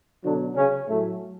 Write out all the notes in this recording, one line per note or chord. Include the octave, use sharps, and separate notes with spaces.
B2 D3 F#3 D4
C#3 C#4
A2 F#3 A3